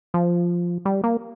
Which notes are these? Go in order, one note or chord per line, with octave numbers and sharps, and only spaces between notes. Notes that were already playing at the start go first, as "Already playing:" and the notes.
F3
G3
A#3